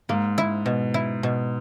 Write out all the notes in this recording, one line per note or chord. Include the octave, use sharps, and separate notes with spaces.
G#2 A#3
E4
B2
E4
B2